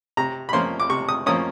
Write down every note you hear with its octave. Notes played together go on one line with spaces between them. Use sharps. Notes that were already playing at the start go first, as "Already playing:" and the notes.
C3 A#5
B5
F3 A#3 C#4 C6
D6
C3 C#6
D#6
F3 A#3 C#4 D#6